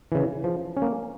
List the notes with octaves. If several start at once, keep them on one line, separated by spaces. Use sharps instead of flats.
C#3 E3
F3
C#4
A#3